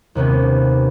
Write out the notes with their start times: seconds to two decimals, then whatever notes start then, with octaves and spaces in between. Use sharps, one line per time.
0.15 D#2 C3 B3 C#4